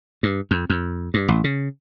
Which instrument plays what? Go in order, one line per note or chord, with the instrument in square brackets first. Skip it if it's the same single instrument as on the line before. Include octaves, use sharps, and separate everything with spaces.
[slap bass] G2
F2
F2
G2
A1
C#3